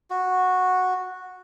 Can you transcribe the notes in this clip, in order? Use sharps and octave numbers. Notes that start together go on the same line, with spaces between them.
F#4